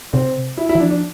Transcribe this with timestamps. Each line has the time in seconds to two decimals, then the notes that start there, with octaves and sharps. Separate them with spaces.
0.13 C3 C4
0.57 E4
0.69 E4
0.75 E3
0.80 F3 D4
0.90 D4